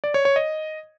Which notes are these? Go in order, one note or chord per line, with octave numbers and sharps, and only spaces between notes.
D5
C#5
C#5
D#5